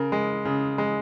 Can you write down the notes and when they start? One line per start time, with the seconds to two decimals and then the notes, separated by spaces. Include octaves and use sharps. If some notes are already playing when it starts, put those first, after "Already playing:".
Already playing: C#3 A#4
0.12 G#3
0.45 C#3
0.78 G#3